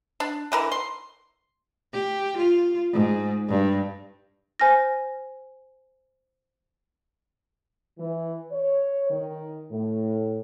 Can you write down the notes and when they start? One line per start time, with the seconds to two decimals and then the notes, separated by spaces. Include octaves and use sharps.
0.20 D4
0.52 D3 E3 A#4
0.72 C6
1.93 G4
2.38 F4
2.93 G#2
3.48 G2
4.60 C5 G#5 F6 A#6
7.98 E3
8.52 C#5
9.10 D#3
9.71 A2